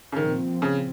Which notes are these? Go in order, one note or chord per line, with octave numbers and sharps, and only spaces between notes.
C#3
A#2 D#3 F3 C4
C#3